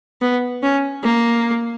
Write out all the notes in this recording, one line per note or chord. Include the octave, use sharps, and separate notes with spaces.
B3
C#4
A#3